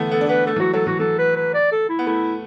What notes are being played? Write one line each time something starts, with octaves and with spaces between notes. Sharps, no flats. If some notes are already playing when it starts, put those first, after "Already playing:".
Already playing: D3 E3 A3 B3
B3 A4
D4
B3 B4
A3 A4
E3
F#3 F#4
F#3 A4
E3 F#4
E3 A4
B4
B4
D5
A4
E4
B3
A3 E4